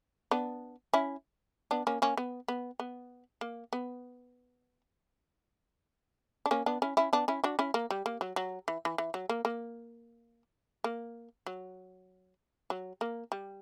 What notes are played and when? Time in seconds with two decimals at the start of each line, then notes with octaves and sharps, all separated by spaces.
0.31 B3 D4
0.93 C#4 E4
1.71 B3 D4
1.87 A#3 C#4
2.02 A#3 C#4
2.17 B3
2.48 B3
2.80 B3
3.41 A#3
3.73 B3
6.46 D4
6.51 A#3 C#4
6.66 B3 D4
6.82 C#4 E4
6.97 C#4 E4
7.13 B3 D4
7.28 C#4 E4
7.44 D4 F#4
7.59 C#4 E4
7.74 A#3
7.91 G3
8.06 A#3
8.21 F#3
8.36 F#3
8.68 E3
8.85 E3
8.98 E3
9.14 F#3
9.29 A#3
9.45 A#3
10.84 A#3
11.46 F#3
12.70 F#3
13.01 A#3
13.32 G3